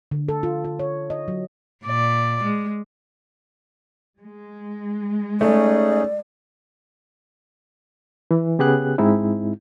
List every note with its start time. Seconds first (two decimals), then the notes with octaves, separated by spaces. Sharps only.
0.11 D3
0.29 A4
0.43 F4
0.65 F4
0.79 C#5
1.10 D#5
1.28 F#3
1.85 A#2 D5
2.44 G#3
4.19 G#3
5.41 A3 C#4 D#4 G#4 D5
8.31 E3
8.59 C#3 B3 G4 G#4 F#6
8.98 G#2 G#3 C4 D#4 E4